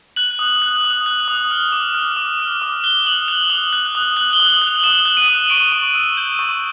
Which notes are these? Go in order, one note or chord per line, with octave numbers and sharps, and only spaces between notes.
F#6 F#7
D#6
F#6
D#6
F#6
D#6
F6
D6
F6
D6
F6
D6
F#6 G7
D#6 F#7
F#6 F7
D#6 F7
F#6
D#6
F#6 F#7
G7
D#6
F#7
F#6
F7
D#6 E7
F#6
D#7
D#6
C#6 D7
C#6
E6
G6
C#6